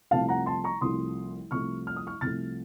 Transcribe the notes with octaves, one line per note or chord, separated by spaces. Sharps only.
C2 C3 F3 A3 F5 A5
F#5 A#5
A5 C6
A#5 C#6
C2 C3 F3 A3 C6 D#6
C2 C3 F3 A3 C#6 F6
F6
D#6
C#6 F6
C2 C3 F3 A3 F6 A6